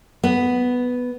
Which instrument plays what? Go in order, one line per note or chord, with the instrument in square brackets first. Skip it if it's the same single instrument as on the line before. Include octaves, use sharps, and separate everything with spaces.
[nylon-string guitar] B3